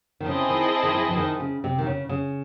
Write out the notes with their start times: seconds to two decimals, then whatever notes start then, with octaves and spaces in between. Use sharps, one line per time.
0.20 D#3
0.26 C#3 C4 E4 G#4 D#5 A5
0.48 D#3
0.83 D#3
0.95 E3
1.10 E3
1.17 D#3
1.40 C#3
1.64 C3
1.78 D#3
1.86 C#3
2.09 C#3